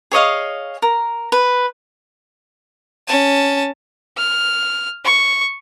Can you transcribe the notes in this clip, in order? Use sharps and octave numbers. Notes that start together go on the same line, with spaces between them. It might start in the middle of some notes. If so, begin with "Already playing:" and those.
G#4 C#5 D#5 F5
A#4
B4
C#4 A5
F6
C#6